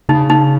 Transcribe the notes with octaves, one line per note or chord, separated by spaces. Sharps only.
C#3 D#4
D#4